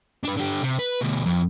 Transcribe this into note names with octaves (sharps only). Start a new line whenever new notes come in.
D4 B4
D3 G4
C3
B4
D2 B2
F2